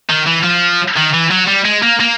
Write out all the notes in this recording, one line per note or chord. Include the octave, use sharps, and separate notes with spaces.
D#3
E3
F3
D#3
E3
F#3
G3
G#3
A#3
A#3